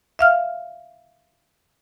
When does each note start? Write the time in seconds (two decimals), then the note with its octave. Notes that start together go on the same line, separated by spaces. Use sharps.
0.19 E5 F5 F6